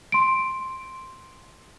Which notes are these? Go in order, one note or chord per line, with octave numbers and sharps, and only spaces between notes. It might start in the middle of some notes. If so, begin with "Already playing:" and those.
C6 D7